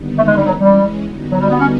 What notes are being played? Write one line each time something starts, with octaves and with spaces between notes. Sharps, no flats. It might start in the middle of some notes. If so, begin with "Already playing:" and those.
Already playing: D#2 D3 G3 B3 D#4
A3
G#3
G3
E3 F#3 G#3 C#4
G3
D3 G3 B3 D#4 F#4
F#3
G3
B3
C#4